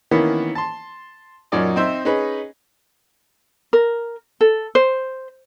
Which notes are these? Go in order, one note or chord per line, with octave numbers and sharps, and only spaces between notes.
D#3 E3 A#3 B3 C#4 E4
A5 C6
F#2 A#2 C#4 D#4 D5 D#5
C4 D#4 C5 E5
C#4 D#4 G#4 B4
A#4
A4
C5